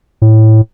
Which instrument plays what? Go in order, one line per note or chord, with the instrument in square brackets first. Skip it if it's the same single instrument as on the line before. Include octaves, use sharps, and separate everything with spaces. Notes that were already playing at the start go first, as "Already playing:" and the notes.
[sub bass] A2